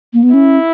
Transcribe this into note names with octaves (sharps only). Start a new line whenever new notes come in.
A#3
B3
C#4 E4